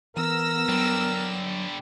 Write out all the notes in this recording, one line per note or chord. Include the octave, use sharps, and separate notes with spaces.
E3 B3 A#4 E6 A#6
D3 F#3 G3